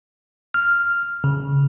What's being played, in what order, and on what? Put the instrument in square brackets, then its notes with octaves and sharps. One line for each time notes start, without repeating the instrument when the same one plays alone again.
[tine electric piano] F6
C#3